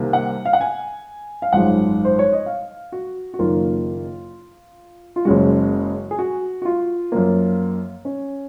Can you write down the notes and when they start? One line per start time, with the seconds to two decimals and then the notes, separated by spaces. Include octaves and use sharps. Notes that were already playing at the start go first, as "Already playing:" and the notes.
Already playing: C2 C3 D#3 A#3
0.13 F#5
0.45 F5
0.53 F#5
0.61 G#5
1.42 F5
1.53 G#1 F#2 F3 G#3 F#5
2.05 C5
2.19 C#5
2.32 D#5
2.46 F5
2.92 F#4
3.34 F#4
3.39 F#1 F#2 D#3 A#3 F4
5.16 F4
5.25 F#1 F#2 C#3 G#3 F#4
6.11 G#4
6.19 F#4
6.62 F#4
6.65 F4
7.12 F#2 F3 A#3
8.05 C#4